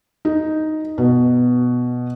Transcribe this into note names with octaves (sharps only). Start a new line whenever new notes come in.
D#4
B2